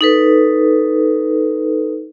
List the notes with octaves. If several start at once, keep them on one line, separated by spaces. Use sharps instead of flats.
D#4 A4 B4